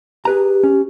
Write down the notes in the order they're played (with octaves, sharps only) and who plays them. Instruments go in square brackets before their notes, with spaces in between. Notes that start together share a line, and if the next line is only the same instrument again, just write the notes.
[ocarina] G4 [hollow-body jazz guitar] G#4 B4 A#5
[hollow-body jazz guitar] C#4